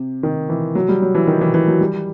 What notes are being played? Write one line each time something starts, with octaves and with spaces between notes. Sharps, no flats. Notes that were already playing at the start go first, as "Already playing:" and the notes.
Already playing: C3
D#3
E3
F#3
G3
F#3
E3
D#3
E3
E3
F#3
G3